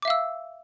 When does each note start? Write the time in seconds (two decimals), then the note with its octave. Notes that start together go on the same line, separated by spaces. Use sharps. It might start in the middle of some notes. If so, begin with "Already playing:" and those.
0.02 D6
0.05 E5
0.08 F5
0.10 E6